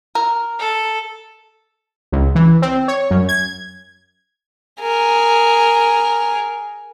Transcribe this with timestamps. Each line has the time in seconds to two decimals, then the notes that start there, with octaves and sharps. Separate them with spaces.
0.15 A#4
0.59 A4
2.12 C#2
2.35 E3
2.62 C4
2.88 C#5
3.11 F#2
3.29 G#6
4.80 G#4 A#4